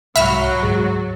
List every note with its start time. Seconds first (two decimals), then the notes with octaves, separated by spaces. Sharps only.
0.16 C2 G#2 F#3 F#4 E5 B5 F6
0.63 D2 G#2 A6 C#7